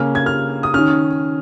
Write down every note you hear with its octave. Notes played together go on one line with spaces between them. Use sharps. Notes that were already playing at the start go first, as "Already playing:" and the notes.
Already playing: C#3 A#3 C#4 F6
G#6
F6
D#6
D#3 C#4 F6